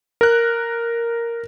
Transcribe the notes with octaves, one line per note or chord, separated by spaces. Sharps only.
A#4 F#6